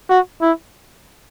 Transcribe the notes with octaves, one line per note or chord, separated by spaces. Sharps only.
F#4
E4